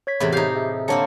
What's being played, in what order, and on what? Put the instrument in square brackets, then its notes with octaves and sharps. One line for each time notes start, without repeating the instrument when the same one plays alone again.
[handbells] C#5 G#6 B6
[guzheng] E2 A2 C3 [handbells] B5
[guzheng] D#4 F5 [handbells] G4 G6 C7
[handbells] G#4 E5
[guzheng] D3 A#3 C4 [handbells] C#5 A5 C#7